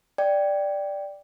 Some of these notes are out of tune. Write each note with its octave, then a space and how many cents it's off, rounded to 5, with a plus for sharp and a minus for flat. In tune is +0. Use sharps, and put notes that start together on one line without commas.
D5 +0 G5 +0